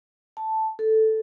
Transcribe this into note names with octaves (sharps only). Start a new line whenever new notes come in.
A5
A4